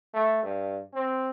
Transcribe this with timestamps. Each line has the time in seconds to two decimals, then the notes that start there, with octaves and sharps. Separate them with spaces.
0.14 A3
0.43 G2
0.94 C4